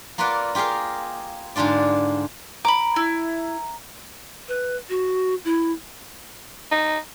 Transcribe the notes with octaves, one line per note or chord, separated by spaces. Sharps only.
A#3 F4 A#4 B4 D5 F#5
F4 G4 G#4 A#4 F5
G#2 D3 D4 F4 D5
A#5 B5 D6
E4
B4
F#4
E4
D#4